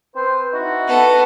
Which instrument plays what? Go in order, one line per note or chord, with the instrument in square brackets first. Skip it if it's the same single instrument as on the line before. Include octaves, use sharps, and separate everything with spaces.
[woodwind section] C4 B4 C5
D#4 E4 F#4
[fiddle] B3 A4